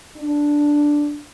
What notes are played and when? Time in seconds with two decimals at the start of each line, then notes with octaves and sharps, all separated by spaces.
0.16 D4